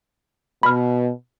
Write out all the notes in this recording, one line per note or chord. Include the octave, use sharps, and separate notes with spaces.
B2 B5 F6